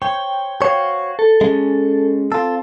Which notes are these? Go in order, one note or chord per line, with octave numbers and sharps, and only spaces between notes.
C5 C#5 G5 C#6
F#4 C5 C#5 F5
A4
G#3 C#4
C4 F4 A4